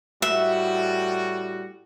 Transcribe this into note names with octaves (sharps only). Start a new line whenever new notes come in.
A2 G3 F#4 E5